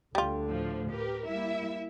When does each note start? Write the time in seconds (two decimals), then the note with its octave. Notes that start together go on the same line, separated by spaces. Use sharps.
0.15 D2 D3 G3 F4
0.48 A2 F3
0.90 A2 G4 A#4 B4
1.27 G3 A#3 E4 E5